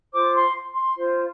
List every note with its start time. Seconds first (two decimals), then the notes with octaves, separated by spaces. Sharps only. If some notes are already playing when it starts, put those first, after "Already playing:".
0.12 F4 C5 D6
0.33 C6
0.73 C6
0.94 F4 C5